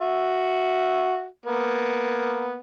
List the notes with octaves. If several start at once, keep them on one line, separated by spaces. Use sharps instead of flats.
F#4 E5
A#3 B3